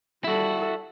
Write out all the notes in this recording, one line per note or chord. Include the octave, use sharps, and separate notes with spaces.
G3 E4 F#4 A4